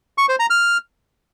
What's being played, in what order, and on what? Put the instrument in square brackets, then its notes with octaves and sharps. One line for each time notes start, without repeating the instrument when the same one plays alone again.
[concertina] C#6
C5
A#5
F6